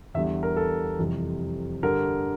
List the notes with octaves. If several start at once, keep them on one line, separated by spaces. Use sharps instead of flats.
E2 D3 G3 E5
A#4
A4
F2 C3 E3 G3
G2 D3 G3 A#4